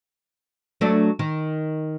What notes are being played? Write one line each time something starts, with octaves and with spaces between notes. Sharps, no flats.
F#3 A3 D4
D#3